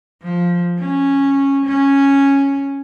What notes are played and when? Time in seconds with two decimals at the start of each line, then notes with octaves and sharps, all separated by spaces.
0.23 F3
0.78 C#4
1.66 C#4